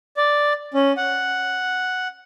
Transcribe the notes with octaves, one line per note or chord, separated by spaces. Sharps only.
D5
C#4
F#5